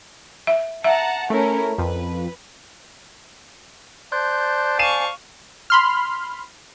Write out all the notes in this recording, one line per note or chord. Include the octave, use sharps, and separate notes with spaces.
E5
E5 F#5 A5 A#5
A3 C#4 E4 A#4
F2 B4
C5 D5 A5 C6 F#6 G6
F5 G#5 C#6 C7 D#7 E7
B5 C6 F6